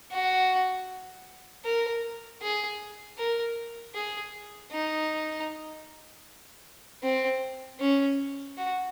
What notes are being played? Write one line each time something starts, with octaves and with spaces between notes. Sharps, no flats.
F#4
A#4
G#4
A#4
G#4
D#4
C4
C#4
F#4